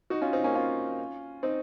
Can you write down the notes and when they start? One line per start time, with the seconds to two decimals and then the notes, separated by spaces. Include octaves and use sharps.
0.10 D#4 F#4
0.22 C#4 F4
0.33 C4 D#4
0.44 A#3 C#4
0.55 C#4 F4
1.43 C4 D#4